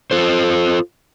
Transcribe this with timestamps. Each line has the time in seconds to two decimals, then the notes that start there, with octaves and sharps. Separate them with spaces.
0.11 F4 A4 C5